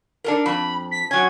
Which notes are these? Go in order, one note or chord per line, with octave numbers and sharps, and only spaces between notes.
D4 A4 A#4
F2 B5
B6
F#3 C#4 G#6